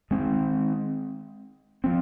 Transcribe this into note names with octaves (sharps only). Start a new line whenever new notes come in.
D#3 G#3 C4
F3 C4